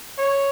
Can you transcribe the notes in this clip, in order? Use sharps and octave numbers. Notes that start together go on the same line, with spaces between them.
C#5